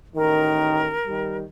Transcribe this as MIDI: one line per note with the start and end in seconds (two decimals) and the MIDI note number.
0.16 0.96 33
0.16 0.96 51
0.16 1.36 70
1.06 1.43 51
1.06 1.43 55